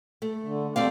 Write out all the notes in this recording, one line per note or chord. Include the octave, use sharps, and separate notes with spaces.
A3
D3
G2 A3 C4 D5 F5